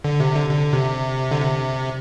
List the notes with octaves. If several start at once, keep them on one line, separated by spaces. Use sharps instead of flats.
D3
C3
D3
D3
C3
D3
C3